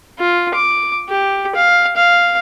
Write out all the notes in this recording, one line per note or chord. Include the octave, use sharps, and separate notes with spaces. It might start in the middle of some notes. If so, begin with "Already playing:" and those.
F4
D6
G4
F5
F5